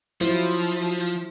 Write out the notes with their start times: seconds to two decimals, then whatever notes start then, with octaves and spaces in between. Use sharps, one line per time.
0.21 F3 F#3 E4 C5